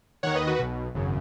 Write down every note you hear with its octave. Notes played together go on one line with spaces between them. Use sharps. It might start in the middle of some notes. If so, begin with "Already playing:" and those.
D#2 D#3 C#5 F#5
B4 D#5
F#4 B4
B1 B2
G#1 F#2 C#3